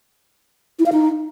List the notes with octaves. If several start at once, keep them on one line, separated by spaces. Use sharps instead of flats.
E4
F5
D#4